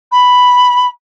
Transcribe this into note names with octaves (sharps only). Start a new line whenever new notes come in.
B5